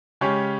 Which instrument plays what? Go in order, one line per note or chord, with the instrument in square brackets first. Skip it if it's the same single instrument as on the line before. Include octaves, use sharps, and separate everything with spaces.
[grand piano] C#3 G#3 C#4 G4 C#5